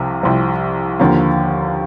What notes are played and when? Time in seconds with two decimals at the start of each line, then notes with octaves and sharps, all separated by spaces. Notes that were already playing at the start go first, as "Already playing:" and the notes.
Already playing: C2 C3 F3 C4
0.23 C2 C3 F3 C4
0.99 D#2 D3 F3 A#3